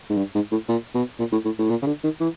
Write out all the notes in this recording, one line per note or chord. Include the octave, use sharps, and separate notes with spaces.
G#2
G2
G#2
A2
A#2
B2
A#2
A2
A2
A2
A#2
C#3
D3
D#3
E3